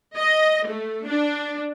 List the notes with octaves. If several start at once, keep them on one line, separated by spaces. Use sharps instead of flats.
D#5
A3
D4